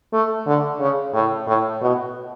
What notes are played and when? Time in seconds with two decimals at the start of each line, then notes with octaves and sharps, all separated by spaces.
0.13 A3
0.47 D3
0.80 C#3
1.14 A2
1.47 A2
1.81 B2